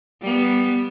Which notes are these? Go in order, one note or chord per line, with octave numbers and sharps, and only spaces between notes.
G3 B3